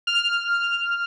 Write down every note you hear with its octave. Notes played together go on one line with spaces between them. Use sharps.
F6